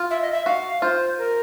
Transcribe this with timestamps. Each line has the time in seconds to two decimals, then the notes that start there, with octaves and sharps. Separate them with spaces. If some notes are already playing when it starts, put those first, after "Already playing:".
Already playing: F4
0.10 E5
0.22 D#5
0.32 E5
0.46 F#4 F5
0.82 F4 C5
1.18 A#4